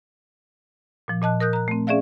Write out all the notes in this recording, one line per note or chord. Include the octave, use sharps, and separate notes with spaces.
A#2 F3
A#2 D#5 A5 F#6
A#4 D#6 F#6 G6
A#5 F#6
A3 C4
C#4 G#4 D5 E5 F5